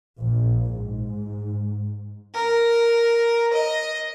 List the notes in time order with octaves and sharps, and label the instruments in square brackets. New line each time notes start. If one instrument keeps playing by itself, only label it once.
[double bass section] A#1
G#2
[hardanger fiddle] A#4
D#5